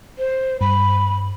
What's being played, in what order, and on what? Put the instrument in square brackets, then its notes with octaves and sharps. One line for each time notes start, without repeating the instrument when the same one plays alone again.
[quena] C5
[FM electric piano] G2 [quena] B5